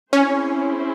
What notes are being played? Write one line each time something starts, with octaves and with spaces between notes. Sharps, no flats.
C4 C#4 E4 G#4 C5